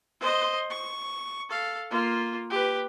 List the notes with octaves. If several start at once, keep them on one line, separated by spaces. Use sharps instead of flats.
C5 D#5
C#6
A4 F5
A#3 F4
G4 B4